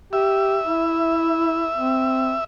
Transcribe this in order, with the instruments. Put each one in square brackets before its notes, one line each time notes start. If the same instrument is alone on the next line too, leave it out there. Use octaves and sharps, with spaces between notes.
[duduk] G4 [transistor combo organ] E5
[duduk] E4
C4